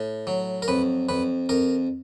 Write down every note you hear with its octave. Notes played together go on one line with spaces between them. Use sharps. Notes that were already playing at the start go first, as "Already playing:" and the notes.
Already playing: A2
F#3
A#4
F2 B4
F2 B4
F2 A#4